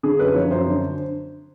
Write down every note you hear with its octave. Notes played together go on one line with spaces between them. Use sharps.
D3 G#4
F#2 B4
F3 C#5
F#2 C5
D3